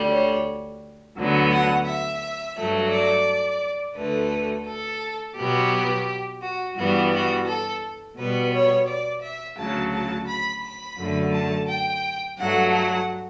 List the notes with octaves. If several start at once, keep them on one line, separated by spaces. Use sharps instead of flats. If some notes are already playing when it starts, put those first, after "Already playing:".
Already playing: D2 D3 G3
C#5
D2 D3 F#3 B3
F#5
E5
G2 F#3 A3
D5
D2 D3 A3 B4
A4
B2 F#3 B3 G4
F#4
G2 E3 G3 B3 F#4
F#4
A4
B2 G3 B3 B4
C#5
D5
E5
D2 C#3 F#3 A5
A5
B5
B5
F#2 D3 A3
A5
G5
G2 F#3 A3 F#5
F#5